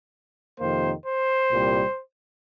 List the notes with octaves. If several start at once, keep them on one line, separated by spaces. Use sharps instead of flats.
F2 C3 D#3 A#3 C5
C5
C2 A#2 G3 C4